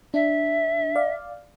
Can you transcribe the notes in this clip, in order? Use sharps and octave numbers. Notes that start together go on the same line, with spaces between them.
D4 E5
D5 F5